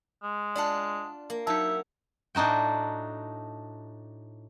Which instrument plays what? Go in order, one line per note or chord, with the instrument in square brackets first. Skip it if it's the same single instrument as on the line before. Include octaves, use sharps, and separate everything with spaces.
[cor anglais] G#3
[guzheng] D4 F4 F#5 [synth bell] D5 A5
[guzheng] A#3
[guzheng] F#3 [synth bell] D#4 A5 [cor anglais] E5
[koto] A2 D4 D#4 F#4 G5